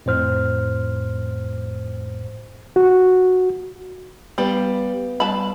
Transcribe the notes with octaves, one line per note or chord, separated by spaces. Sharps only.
F2 A2 C5 F6
F#4
G3 B3 F5 G5
G3 F4 B4 A5 B5